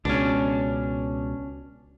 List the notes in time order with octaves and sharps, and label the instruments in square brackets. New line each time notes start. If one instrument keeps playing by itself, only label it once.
[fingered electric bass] C#2 B2 [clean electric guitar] C#4 D4